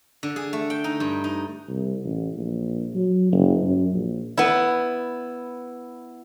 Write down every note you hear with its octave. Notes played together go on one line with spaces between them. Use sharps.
D3
G#4
A3
G5
D#4
G2
D#4
C2
A1
A#1
F#3
F#1
F#2
A#1
B3 E4